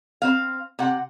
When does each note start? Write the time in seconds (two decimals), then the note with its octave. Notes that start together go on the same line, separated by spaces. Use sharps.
0.22 C4 F5
0.79 C3 F#5